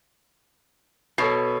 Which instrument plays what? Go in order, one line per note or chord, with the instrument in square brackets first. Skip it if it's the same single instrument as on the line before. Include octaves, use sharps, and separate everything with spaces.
[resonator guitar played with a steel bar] B2 [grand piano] A4 C#5 C7